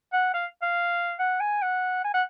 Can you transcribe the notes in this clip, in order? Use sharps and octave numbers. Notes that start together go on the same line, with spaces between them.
F#5
F5
F5
F#5
G#5
F#5
G#5
F#5